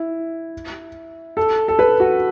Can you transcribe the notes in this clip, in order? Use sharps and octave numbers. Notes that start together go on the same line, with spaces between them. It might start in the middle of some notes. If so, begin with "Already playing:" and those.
Already playing: E4
A4
A4
B4
F#4